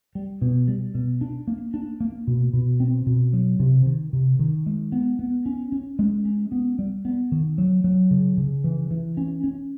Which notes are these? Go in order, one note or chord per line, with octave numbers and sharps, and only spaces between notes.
G3
B2
G3
B2
D4
A#3
D4
A#3
B2
B2
C4
B2
F#3
C3
D#3
C3
D#3
G#3
B3
B3
C#4
C#4
G#3
C#4
B3
G3
B3
D#3
F#3
F#3
C#3
C#3
E3
E3
C#4
C#4